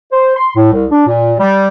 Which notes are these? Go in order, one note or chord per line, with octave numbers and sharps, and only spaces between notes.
C5
C6
A2
C2
D4
A#2
G3